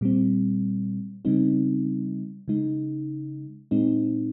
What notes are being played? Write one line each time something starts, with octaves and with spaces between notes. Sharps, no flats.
A#2 G3 C4
C#3 G3 C4 D#4
C#3 G#3 D#4
A#2 G#3 C4 D#4